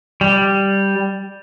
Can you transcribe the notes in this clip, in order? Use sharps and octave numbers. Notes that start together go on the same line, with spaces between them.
G3